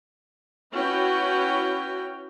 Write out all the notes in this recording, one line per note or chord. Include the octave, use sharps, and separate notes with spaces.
C#4 E4 F#4 B4 C#5 G5